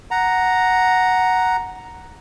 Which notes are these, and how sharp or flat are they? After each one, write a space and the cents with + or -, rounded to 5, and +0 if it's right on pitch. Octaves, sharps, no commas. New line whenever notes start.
F#5 +0 A#5 +0